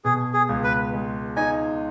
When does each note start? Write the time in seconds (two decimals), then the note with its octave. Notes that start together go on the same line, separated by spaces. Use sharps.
0.05 B2 G#4
0.34 G#4
0.49 C#2
0.64 B4
0.93 G#3
1.36 D#4 G#5